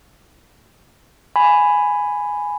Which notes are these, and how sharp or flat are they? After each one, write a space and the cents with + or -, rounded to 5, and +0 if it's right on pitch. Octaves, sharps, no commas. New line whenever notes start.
G#5 +0 B5 +10